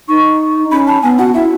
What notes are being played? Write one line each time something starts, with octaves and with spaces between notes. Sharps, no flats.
D#4 C#6
C#4 B5
A5
B3 G#5
F#4 F#5
E4 E5